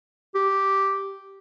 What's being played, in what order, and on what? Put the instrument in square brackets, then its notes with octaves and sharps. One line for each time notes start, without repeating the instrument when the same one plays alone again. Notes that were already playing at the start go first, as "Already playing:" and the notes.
[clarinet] G4